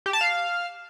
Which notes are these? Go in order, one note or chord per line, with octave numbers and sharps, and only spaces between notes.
G4
A5
F5